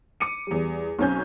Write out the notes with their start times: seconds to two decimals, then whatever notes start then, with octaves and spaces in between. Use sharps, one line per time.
0.20 D6 C#7 D#7
0.47 E2 G3
0.99 B1 C4 C#4 G#5 G6